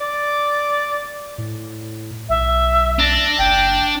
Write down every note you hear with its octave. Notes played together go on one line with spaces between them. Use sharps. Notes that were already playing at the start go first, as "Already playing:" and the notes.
D5
A2
B1 E5
D4 A#6
F#1 G5